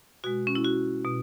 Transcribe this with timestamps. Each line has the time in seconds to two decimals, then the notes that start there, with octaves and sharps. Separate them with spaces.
0.24 B2 G#3 F#4
0.47 C#4
0.55 E4
0.65 F#4
1.05 B2